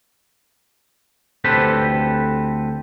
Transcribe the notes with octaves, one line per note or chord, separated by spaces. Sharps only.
D2 C4 G4 A4 B4